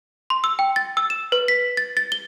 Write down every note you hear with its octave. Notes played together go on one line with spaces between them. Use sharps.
C6
E6
G5
A6
E6
E7
B4
B6
A6
A6
G7